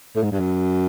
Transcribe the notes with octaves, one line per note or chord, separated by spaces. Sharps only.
A2
G#2
G2
F#2